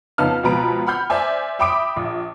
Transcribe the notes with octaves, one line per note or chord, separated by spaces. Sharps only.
F2 C#3 B3 D#4 A5 F6
C#2 B2 F3 B4 A#5 D7
F#5 B5 F6 G6
C5 D5 E5 G#5
E5 G5 B5 D6 D#6 D7
A#1